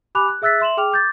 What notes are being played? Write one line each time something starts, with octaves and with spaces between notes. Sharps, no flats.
G4 G#5 B5 D6 F#6 F7
F#6
G#4 E5 E6 F#6 A6 B6
E5 C6 E7 F#7
G#4 G5 D6 F6 F7
D6 G6 A6